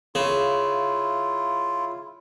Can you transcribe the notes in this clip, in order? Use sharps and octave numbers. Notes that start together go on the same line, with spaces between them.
C#3 E4 F4